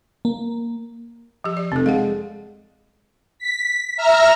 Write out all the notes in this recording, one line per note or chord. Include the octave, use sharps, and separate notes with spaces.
A#3
F3 G4
D5
F1 C4 A4
G#3 F5 F#5
B6
E5 A#5 F6